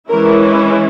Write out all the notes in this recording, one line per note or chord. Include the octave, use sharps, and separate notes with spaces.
E3 G#3 C#4 E4 A#4